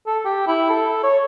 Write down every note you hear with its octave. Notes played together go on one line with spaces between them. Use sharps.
A4
G4
E4
A4
C#5